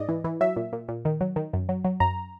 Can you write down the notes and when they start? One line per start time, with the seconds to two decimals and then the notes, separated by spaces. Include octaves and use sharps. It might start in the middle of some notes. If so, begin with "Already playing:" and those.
Already playing: G#2 D5 D#5
0.09 E3
0.24 E3
0.41 F#3 E5
0.56 A#2
0.73 A#2
0.89 A#2
1.05 D#3
1.21 F#3
1.36 D#3
1.53 F#2
1.69 F#3
1.84 F#3
2.00 F#2 A#5